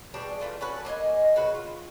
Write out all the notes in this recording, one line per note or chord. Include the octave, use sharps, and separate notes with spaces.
B2 G3 D4 G#4
E3 A3 F4
C#4 F#4 A4 B4
A#3 D#5 E5 G#5
C#3 F#4 B4
F4